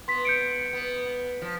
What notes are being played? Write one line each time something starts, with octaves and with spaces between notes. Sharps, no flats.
B3 C6 B6
G6 C#7 D7
B3
F3